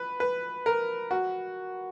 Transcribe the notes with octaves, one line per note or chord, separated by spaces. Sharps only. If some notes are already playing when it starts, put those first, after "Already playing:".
Already playing: B4
B4
A#4
F#4